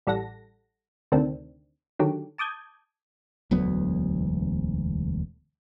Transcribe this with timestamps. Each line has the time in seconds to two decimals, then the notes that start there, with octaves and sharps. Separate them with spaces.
0.07 A1 G3 A4 F#5 A#6
1.12 D2 C3 D#3 C4 D4
1.99 D3 D#3 F#3 G4
2.38 A5 D6 D#6 G6 G#6
3.51 E1 D2 F#3 B3